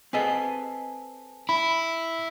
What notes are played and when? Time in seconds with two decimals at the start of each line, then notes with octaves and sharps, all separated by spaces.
0.13 C4 G#4 A4 B4 D#5 G#5
1.49 E4 B5